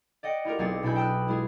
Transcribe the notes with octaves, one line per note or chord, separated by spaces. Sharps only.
D5 D#5 F#5 G5
E4 F4 G4 A#4
B1 C4 G#4 F#5 D6 A6
B2 D4 E4 G#5 B5 G6
G5 A5 D#6 E6 F#6
G#3 E4 F4 G#4